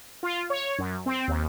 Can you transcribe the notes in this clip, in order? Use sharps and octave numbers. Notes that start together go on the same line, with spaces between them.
F4
C#5
F#2
C4
D#2